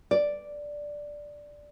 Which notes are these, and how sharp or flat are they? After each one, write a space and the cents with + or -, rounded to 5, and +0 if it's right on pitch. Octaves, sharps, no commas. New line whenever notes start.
D5 +0